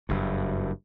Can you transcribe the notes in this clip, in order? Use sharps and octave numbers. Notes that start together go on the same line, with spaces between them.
F#1 G2